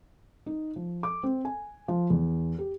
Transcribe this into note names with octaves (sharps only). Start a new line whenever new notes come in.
D#4
F3
D6
C4
G#5
F3
E2
G4